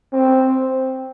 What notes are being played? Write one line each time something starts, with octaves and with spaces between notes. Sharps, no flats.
C4